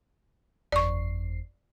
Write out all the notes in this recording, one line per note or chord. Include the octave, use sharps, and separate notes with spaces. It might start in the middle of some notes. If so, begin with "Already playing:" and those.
G1 F2 D5 C#6 C7